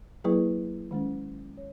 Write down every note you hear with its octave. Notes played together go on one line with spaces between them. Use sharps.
F#3 A#3 E4 G#4 B4
D#3 G#3 C#4
C#5